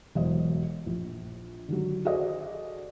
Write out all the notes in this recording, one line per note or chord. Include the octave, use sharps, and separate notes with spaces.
E1 F#3 F#4 C5 D#5
A#1
D3 D#3 F#3
F#4 G#4 A4 C5 D5 D#5